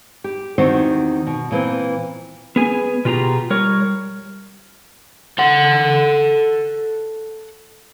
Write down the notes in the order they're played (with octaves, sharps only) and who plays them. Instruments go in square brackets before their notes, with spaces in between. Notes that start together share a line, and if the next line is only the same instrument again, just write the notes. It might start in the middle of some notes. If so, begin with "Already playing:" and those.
[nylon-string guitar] G4
E2 D#3 C4 F#4 G4 C5
B2
A#2 E3 C4
[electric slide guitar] B3 G#4 G#5
B2 F4 G4 G#4 A#5
G3 A#4 C#5
[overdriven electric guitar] A4 F#5